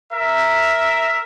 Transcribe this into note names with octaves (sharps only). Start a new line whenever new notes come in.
A#4 E5